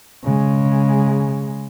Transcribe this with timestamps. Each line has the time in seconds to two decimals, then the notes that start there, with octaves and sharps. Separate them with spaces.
0.24 C#3 G#3